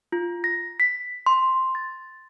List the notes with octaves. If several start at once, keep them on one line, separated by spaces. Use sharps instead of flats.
F4
A#6
B6
C6
A6